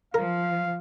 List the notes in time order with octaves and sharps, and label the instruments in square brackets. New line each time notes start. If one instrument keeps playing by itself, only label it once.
[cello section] F3 [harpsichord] A#4 [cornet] F5